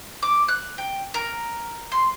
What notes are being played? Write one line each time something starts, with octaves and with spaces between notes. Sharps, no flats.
D6
F#6
G5
A#4
C6